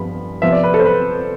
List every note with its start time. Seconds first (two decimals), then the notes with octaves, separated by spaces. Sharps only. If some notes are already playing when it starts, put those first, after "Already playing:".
Already playing: G2 F3 B3 B5
0.42 C3 F3 B3 E5
0.52 D5
0.64 B4
0.74 A4
0.79 C5
0.85 B4